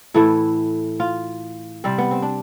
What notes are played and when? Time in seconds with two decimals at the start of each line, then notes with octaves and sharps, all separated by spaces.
0.14 A2 E3 A3 E4
1.00 F4
1.84 C3 G3 C4
1.98 B3
2.11 C4
2.22 D4